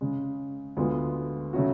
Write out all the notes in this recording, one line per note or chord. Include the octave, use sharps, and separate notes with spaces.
C#3 G#3 C#4
D2 D3 G#3 B3 F4
C#3 F#3 A3 C#4 F#4